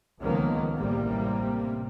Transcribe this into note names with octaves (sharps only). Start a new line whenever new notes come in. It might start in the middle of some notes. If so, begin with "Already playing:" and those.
C#2 D#3 F3 G#3 A#3 B3
A1 C3 G3 A#3